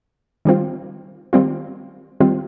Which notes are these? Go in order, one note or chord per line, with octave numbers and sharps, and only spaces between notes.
D#3 G3 C4 F4
D#3 G3 C4 F4
D#3 G3 C4 F4